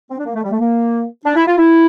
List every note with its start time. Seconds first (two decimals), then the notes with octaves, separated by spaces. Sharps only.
0.10 C4
0.18 D4
0.26 A#3
0.35 A3
0.43 G3
0.51 A3
0.60 A#3
1.25 D4
1.36 E4
1.47 F4
1.57 E4